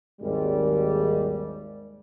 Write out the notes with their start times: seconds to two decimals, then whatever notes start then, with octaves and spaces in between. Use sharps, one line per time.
0.21 G#1 D#2 G3 G#3